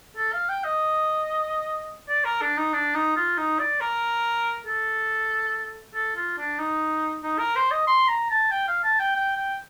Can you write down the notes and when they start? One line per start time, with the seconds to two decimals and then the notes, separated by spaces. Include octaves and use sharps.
0.17 A4
0.33 F5
0.49 G5
0.64 D#5
2.09 D5
2.25 A#4
2.41 D4
2.57 D#4
2.73 D4
2.94 D#4
3.16 F4
3.37 D#4
3.59 D5
3.81 A#4
4.66 A4
5.94 A4
6.16 F4
6.38 D4
6.59 D#4
7.23 D#4
7.39 A#4
7.56 C5
7.71 D#5
7.87 C6
8.08 A#5
8.31 A5
8.51 G5
8.68 F5
8.83 A5
8.99 G5
9.16 G5
9.36 G5